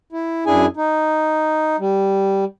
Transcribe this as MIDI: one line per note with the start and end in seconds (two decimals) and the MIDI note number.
0.12 0.44 64
0.47 0.66 42
0.47 0.66 62
0.47 0.66 64
0.47 0.66 68
0.47 0.66 80
0.77 1.76 63
1.79 2.45 55